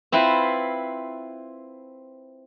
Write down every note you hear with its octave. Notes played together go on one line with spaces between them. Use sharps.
C4 E4 F4 B4 C5